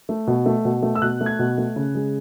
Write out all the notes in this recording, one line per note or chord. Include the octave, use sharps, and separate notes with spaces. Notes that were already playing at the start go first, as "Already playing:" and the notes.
A3
B2
A3
B2
A3
E6
B2 F#6
A3
G#6
B2
A3
C#3
G#3